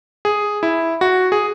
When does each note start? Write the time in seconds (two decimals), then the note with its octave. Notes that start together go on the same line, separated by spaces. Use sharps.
0.25 G#4
0.63 E4
1.01 F#4
1.32 G#4